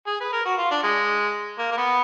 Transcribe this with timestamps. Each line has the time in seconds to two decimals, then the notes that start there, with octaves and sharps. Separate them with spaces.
0.07 G#4
0.21 B4
0.32 A#4
0.45 F#4
0.57 F4
0.71 D4
0.83 G#3
1.58 A#3
1.71 A#3
1.77 B3